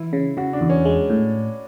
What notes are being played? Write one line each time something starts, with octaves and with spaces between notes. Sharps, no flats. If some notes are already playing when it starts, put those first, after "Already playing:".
Already playing: E3 E4
C#3
C#3 F#4
D4
E2
C#4
G#3
A2